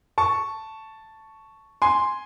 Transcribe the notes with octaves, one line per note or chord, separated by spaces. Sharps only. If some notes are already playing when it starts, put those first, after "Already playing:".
A5 C#6
G#5 C6